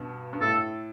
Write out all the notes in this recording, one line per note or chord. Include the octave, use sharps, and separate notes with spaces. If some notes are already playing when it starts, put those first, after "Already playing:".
Already playing: G2 B2
G2
A2 A4